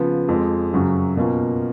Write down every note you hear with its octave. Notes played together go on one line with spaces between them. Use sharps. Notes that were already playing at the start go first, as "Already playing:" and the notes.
Already playing: C#3 F3 B3
F2 F3 G#3
F#2 C#3 F#3 C#4 F#4
B2 A#3 C#4 F4